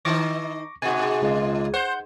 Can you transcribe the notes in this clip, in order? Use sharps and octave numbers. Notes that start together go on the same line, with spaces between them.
D#3 D#4 C#6 D6 A#6
G#2 B2 F#4 G#5
C#2 G#3 F4
C5 F#5 G6